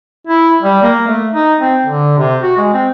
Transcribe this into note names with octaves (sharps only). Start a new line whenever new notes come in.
E4
G3
A#3
A3
D#4
C4
D3
C3
F#4
G#3
C4